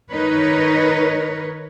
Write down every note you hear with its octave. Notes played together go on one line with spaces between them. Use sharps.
D#3 D#4 A#4 B4 C#5